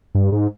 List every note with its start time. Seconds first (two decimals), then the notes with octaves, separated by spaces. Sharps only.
0.15 G2
0.32 G#2